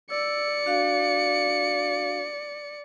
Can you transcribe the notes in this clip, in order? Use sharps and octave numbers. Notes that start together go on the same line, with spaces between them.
D5 E6 C#7
D4 F#4 F5